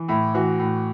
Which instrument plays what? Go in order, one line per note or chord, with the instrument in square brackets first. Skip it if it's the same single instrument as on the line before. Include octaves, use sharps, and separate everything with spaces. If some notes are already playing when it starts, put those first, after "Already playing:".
Already playing: [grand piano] E3
A2 E4
E3 F#4
A2